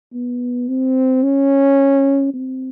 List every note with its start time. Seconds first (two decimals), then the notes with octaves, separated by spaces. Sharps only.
0.13 B3
0.68 C4
1.23 C#4
2.34 C4